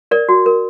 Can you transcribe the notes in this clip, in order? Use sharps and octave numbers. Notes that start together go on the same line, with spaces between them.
A#4 D5
F#4
A#4